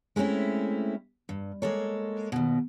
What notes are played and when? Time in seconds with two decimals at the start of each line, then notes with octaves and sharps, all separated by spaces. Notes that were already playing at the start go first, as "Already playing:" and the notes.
0.16 G#3 A3 C4 C#4 E4
1.29 G2
1.62 G#3 A#3 A4 C#5
2.32 D#2 B2